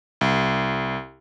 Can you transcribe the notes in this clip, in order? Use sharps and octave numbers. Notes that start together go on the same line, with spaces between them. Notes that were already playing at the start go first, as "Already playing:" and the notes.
C2